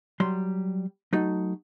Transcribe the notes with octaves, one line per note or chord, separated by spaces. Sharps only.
F#3 G3 C6
F#3 A3 D#4